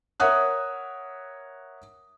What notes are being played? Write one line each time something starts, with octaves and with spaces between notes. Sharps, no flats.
A#4 C#5 E5 F#5 D#6 F#6